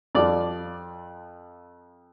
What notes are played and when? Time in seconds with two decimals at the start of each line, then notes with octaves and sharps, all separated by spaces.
0.15 F2 F3 D5